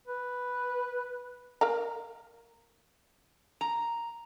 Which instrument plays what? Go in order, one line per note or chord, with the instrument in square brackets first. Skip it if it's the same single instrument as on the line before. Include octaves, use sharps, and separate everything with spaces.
[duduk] B4
[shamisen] A#4 F5 A#5
[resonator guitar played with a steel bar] A#5